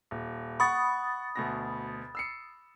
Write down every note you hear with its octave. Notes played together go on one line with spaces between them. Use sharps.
D#1
F#5 B5 C#6 D#6 A6
D2 B2 A#6
E6 C7 C#7